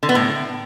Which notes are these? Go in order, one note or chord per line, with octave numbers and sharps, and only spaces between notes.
D3
B3
A2